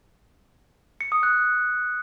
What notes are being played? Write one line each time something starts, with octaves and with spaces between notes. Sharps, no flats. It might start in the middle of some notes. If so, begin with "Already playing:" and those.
C#7
D#6
F#6